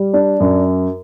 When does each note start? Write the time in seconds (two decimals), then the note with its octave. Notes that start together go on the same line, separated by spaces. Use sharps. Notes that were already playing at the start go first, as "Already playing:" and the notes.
Already playing: G3
0.14 D4
0.40 F#2